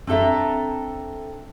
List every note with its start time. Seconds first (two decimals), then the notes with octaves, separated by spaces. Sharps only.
0.07 C4 D4 A4 E5 A#5